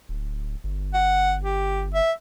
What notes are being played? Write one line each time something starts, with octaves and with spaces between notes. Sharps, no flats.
D1
G1
F#5
G4
E5